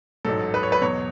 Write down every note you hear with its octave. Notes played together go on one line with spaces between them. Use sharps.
A1 G#2 F#3 A4
B4
C#5
B4
E2 B2 F#3 C#5